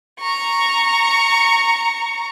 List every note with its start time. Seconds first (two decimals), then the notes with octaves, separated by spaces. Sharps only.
0.20 A#5 C#6